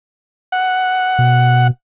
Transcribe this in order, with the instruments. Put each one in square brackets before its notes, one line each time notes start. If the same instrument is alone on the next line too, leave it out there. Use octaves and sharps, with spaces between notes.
[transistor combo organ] F#5
[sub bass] B2